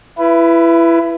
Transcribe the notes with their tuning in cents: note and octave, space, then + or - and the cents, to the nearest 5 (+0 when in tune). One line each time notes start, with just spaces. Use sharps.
E4 +25 B4 +0